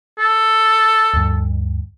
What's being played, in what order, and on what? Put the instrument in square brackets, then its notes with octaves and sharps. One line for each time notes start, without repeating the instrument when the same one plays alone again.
[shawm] A4
[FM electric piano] D2 G2